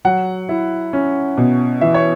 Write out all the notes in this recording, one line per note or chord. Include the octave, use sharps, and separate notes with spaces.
F#3 F#5
E4
C#4
B2
E3 E5
C#5